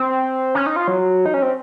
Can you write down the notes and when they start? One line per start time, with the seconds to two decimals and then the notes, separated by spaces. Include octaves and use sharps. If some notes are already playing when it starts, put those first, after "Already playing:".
Already playing: C4
0.55 C#4
0.67 D#4
0.76 F4
0.88 F#3
1.26 D#4
1.34 C#4
1.42 C4